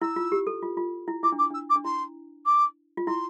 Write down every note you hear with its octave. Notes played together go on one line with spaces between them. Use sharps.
E4 E6
F4
G4
A4
F4
F4
E4
E4 D6
D4
D6
D4 E6
D6
D4
E4 C6
D6
F4
E4 C6